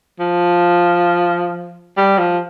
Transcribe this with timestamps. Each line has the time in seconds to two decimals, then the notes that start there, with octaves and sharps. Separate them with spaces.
0.20 F3
1.97 G3
2.18 F3